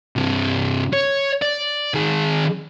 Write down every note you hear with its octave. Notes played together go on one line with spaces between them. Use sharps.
G2 C3
C#5
D5
D#3 G#4